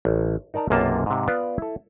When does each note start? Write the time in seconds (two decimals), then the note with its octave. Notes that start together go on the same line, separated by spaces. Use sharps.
0.05 A1
0.54 D#4 A#4 D5 A5 A#5
0.70 B1 F#2 C3 A#3 F4 A5
1.06 G#2 C3
1.28 B3 F4 B4 D5 F5
1.58 E4 A4